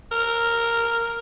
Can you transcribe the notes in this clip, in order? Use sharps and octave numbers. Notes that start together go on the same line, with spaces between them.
A#4